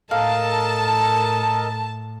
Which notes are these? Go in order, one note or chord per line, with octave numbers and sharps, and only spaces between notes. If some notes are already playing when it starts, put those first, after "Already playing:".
A2 A4 A#4 D#5 F5 A5